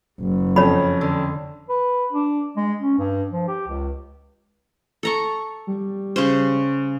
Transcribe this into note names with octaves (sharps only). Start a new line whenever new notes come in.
F#1
F2 C#4 C#5 B5
D3
B4
D4
G#3
C#4
G2
F3
G4
C#2
A4 A#5 C#6
G3
C#3 C#4 C5